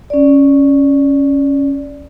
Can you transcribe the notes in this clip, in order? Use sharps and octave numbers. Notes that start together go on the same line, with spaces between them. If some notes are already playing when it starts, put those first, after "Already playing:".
C#4 D5